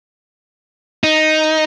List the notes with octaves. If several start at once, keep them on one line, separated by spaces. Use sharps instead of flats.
D#4